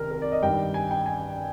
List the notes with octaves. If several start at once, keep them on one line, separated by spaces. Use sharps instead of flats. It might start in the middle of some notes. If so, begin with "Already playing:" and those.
Already playing: C2 C3 D#3 A#4
A#4
D5
D#5
G2 D#3 G5
G#5
G5
G#5